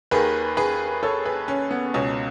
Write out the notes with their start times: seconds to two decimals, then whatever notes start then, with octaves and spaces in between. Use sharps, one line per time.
0.11 D#2 D#3 G#4 B4
0.57 G#4 B4
1.03 A4 C#5
1.25 G#4 B4
1.48 C#4
1.71 B3
1.94 C#2 B2 C#4